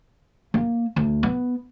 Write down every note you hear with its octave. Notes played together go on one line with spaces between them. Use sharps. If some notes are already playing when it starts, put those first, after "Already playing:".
A#3
D2
B3